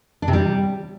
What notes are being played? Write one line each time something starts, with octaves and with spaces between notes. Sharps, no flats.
D4
C3
G3